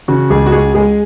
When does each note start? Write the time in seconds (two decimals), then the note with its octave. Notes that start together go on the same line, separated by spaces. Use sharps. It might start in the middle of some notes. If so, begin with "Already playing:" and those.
0.08 C#3 F#4
0.30 C#2 G#4
0.46 F#4
0.52 G#3 G#4
0.75 G#3 G#4